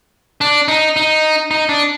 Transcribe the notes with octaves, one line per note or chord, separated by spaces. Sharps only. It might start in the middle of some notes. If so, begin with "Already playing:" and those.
D4
D#4
D#4
D#4
D4